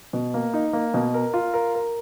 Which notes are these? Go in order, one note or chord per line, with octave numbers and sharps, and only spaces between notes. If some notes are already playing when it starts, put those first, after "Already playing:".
B2
A#3
D#4
A#3
B2
A#4
F4
A#4
A#4